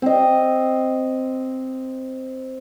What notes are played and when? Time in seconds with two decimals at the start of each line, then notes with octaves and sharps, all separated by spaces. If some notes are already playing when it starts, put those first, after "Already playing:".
0.02 C4 D#5